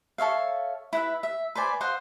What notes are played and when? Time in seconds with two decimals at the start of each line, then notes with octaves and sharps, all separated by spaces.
0.18 A4 C#5 E5 F5
0.93 E4 B4 E5
1.23 E5
1.55 B4 C5 D5 G#5
1.81 C5 D#5 F5 F#5